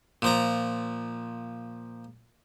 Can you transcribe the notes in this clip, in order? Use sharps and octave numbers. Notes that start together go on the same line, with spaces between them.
A#2 F3 A#5